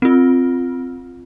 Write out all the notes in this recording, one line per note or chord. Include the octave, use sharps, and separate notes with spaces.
C4 F4